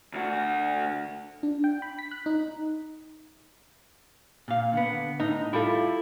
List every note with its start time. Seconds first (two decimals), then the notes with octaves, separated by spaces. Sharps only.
0.13 D2 F#4
1.43 D4
1.64 G5
1.82 B5
1.99 B6
2.11 F#6
2.26 D#4
4.48 A#2 F5
4.73 D3 B3
5.20 A2 D#4
5.53 G3 E4 F4 A4